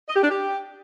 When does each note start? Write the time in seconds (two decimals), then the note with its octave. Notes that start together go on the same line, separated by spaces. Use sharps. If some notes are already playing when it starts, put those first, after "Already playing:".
0.09 D#5
0.16 G4
0.23 D4
0.30 G4